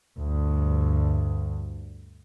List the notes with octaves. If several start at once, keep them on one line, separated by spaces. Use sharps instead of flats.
D2 G2